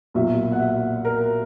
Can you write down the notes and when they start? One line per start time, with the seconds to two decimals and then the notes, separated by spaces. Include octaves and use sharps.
0.14 B1 A#2 F#3 E5
0.52 F#5
0.59 E5
1.05 A#4